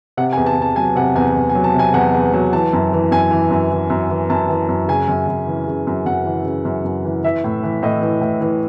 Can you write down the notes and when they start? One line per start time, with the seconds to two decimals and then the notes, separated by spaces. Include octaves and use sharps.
0.17 C3 F#5
0.33 G#5
0.37 E2
0.46 A5
0.57 E2
0.62 A5
0.76 F#3 G#5
0.96 C3 F#5
1.15 E2 G#5
1.35 E2
1.50 G#5
1.55 F#3
1.64 A5
1.74 C3
1.79 G#5
1.94 E2 F#5
2.14 E2
2.33 F#3
2.53 E3 A5
2.73 F#2
2.93 E3
3.11 F#2 G#5
3.31 E3
3.51 F#2
3.70 E3
3.90 F#2
4.10 E3
4.30 F#2 A5
4.49 E3
4.69 F#2
4.88 C#3 G#5
5.08 F#2
5.28 F#2
5.47 E3
5.67 C#3
5.87 F#2
6.06 F#2 F#5
6.25 E3
6.45 C#3
6.65 F#2
6.84 F#2
7.05 E3
7.23 E3 E5
7.44 A2
7.63 E3
7.83 A2 D#5
8.02 E3
8.21 A2
8.41 E3